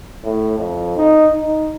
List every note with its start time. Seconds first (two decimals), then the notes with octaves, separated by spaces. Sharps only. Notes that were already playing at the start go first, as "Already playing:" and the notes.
0.23 A2
0.58 F2
0.97 D#4
1.41 D#4